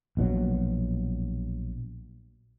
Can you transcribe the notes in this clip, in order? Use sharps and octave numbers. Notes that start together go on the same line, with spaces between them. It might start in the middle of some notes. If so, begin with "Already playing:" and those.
A#1 B2 E3 F#3